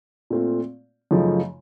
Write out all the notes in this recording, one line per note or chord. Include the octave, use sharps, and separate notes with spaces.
A#2 A3 C4 F4
F#2 C#3 F3 A3 D#4